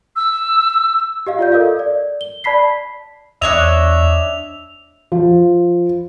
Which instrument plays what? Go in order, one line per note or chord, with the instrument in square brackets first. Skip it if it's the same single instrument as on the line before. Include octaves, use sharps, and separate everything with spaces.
[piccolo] E6
[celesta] G4 D#5 F5
F4 D5 G6
A4 A#4 D#5 F5
D5
G7
D5 A5 B5 B6 C7
[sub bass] E2 [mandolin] D4 C#5 D#5 [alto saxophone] E5 [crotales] F7
[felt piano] F3